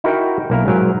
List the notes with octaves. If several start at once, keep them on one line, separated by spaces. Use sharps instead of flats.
D#4 E4 F#4 A#4 F#5 G5
B1 A#3 E4 A#4
G#2 F#3 A#4